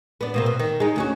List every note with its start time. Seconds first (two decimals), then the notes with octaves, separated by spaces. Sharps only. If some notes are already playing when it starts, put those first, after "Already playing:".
0.21 B3 D4
0.34 B2 A#3 C4
0.46 B2
0.60 D#3
0.80 G#3 D#4
0.96 D2 C#4 F#4